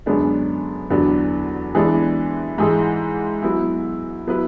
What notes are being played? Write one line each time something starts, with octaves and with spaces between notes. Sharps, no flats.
F#2 D3 G#3 B3 D4
E2 D3 F#3 B3 D4
E3 G#3 B3 D4
G#2 E3 G#3
F#3 B3 E4
F#3 B3 E4 B4